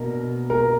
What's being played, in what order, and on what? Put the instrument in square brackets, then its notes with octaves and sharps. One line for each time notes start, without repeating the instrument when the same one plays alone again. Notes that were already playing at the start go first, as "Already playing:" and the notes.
Already playing: [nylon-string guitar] B2 A#3 D4 [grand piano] A#4
[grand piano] A#4